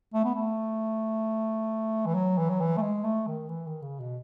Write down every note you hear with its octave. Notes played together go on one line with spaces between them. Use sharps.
A3
B3
A3
E3
F#3
E3
F#3
E3
A3
G#3
A3
D#3
E3
D#3
C#3
B2